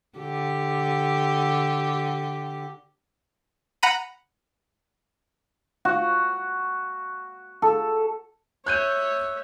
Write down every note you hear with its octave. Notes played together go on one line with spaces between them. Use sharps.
D3 G4
F#5 A#5 B5 D#7
F#4
A4
C#5 E5 F#6 G6 D#7